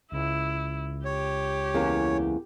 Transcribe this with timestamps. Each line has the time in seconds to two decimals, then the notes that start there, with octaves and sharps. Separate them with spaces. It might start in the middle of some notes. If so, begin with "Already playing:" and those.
0.12 C#2 E4
1.05 G4 C#5
1.74 E2 A#3 C#4